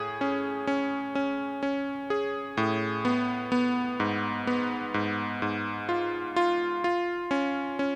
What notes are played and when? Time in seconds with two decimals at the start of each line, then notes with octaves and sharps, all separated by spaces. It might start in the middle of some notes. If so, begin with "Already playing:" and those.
Already playing: A2 G#4
0.21 C#4
0.67 C#4
1.15 C#4
1.63 C#4
2.10 G#4
2.57 A2
3.05 B3
3.52 B3
4.00 G#2
4.47 B3
4.94 G#2
5.42 G#2
5.89 F4
6.36 F4
6.84 F4
7.31 C#4
7.79 C#4